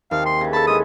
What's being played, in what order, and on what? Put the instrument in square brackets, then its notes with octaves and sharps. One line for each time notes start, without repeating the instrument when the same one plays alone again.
[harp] D#2 [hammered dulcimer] C3 [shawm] F5
[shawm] C6
[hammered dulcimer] C#3 E3
[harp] A4 B5 [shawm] A5
[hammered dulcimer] G#3 E4 [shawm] D#6